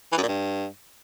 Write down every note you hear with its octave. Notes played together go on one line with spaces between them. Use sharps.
E3
F#2
A#2
G2